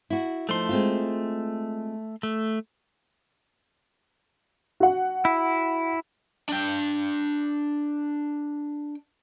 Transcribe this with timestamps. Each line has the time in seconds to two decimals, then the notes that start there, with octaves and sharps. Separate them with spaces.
0.10 E4 F#4
0.49 F3 A3 D#4 C6
0.69 G#3 C4 F4
2.23 A3
4.80 F#4 F#5
5.25 E4
6.49 D4 G5